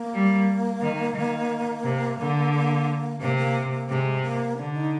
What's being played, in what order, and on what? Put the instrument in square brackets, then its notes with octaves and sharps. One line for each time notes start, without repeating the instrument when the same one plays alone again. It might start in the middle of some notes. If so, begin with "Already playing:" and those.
Already playing: [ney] A#3
[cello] G3
D#3
D#3
C3
D3
[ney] A#3
[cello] C3 [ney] A#3
[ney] A#3
A#3
[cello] C3 [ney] G#3 A#3
[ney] A#3
[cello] D3 [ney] D4
[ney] D#4